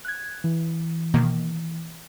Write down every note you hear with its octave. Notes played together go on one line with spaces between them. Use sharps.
F#6 G#6
E3
B2 D#3 A#3